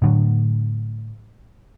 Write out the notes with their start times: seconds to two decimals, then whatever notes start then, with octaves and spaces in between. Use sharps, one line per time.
0.02 A2 D3 F#3